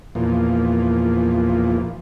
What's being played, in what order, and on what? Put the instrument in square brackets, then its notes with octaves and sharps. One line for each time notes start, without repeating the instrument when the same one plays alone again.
[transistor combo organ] E2 A#2 F3